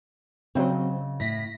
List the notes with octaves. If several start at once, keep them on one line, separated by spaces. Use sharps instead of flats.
C#3 F#3 C4 D#5
A2 A#6 B6